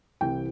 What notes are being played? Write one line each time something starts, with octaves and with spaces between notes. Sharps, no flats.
C2 C3 E3 G5